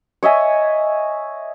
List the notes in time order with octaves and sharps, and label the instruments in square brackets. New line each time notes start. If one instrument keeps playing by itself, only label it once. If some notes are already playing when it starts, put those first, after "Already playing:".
[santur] C#5 D#5 E5 G#5